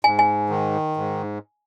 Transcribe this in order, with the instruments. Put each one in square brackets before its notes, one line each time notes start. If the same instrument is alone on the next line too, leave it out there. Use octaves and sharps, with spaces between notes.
[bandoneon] G#2 [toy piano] G#5
[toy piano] G#5
[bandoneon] D#3
G#2